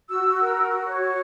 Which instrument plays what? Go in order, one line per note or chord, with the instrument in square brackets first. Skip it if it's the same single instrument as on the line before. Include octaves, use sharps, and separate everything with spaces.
[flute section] F#4 E6
F#4
A#4
F#4
F#4
C#5
F#4